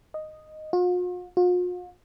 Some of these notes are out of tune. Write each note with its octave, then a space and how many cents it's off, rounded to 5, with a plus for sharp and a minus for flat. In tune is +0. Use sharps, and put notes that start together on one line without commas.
D#5 -5
F4 +45
F4 +45